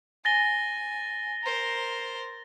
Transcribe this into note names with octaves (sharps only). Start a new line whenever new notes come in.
G#5 A6 A#6 G7
A#4 C5